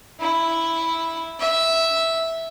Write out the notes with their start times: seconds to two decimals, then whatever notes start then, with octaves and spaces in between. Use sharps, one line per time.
0.20 E4
1.39 E5